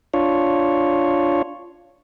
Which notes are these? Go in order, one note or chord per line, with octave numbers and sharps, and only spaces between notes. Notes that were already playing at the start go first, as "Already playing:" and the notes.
D4 F4 C#5